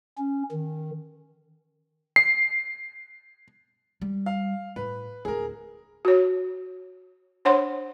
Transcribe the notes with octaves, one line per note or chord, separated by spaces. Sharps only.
C#4
D#3
C7
G3
F5
A2 B4
D1 E4 G#4 A#4
F#4 C#5
D4 C5 C#5 F#5 C6